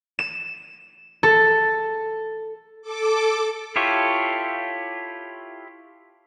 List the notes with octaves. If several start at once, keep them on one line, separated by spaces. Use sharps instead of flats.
E7
A4
A4 D6
E4 F4 G4 A4 C#5